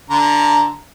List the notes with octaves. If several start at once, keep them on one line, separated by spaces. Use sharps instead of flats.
D3 A#5